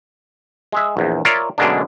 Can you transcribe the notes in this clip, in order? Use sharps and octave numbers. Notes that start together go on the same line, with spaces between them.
G#3 G#4 E5
A#1 E2
F4 A#4 C#5 D5 E5 F5
F#2 B2 D3 G#3 A#3 D4